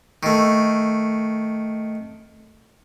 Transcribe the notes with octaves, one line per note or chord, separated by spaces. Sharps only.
D#3 A3